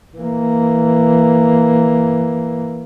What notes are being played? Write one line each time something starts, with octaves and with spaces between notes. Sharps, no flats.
E3 A#3